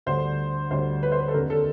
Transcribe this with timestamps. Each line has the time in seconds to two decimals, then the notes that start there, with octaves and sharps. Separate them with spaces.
0.06 D2 D3 G3 C5
0.71 D2 D3 G3 C5
1.03 B4
1.12 C5
1.20 B4
1.28 A4
1.34 F1 D#2 D3 A#4
1.50 A4